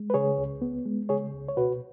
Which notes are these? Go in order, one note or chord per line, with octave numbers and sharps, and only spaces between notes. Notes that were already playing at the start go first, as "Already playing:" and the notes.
Already playing: G#3
B4
C#3 G#4 C#5
C#2
B3
G#3
C#3 G#4 C#5
C#2
C#5
B2 F#4 B4